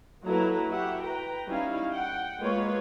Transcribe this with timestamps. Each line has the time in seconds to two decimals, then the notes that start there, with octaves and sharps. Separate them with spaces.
0.24 F#3 A#3 E4 A4 B4 A#5
0.71 E4 F#4 G4 E5 F#5
1.02 B4 G5 A#5
1.48 G3 C#4 D#4 E4 F5
1.92 F#5 G5
2.38 G#3 A#3 F4 B4 C#5